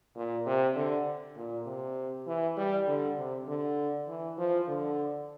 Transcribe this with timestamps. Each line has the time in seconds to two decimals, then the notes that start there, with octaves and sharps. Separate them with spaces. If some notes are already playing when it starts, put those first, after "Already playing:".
0.16 A#2
0.46 C3
0.76 D3
1.36 A#2
1.66 C3
2.27 E3
2.57 G3
2.87 D3
3.17 C3
3.48 D3
4.08 E3
4.38 F3
4.67 D3